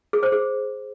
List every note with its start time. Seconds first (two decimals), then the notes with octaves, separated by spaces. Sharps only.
0.13 G#4
0.23 C5
0.32 G#4